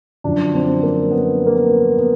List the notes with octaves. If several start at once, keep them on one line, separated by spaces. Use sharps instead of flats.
F#2 D3 F3 D4
C4
A#3
B3
A#3
B3
B3